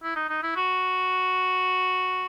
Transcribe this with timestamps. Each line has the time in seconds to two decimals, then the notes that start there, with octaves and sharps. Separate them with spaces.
0.03 E4
0.16 D#4
0.29 D#4
0.43 E4
0.56 F#4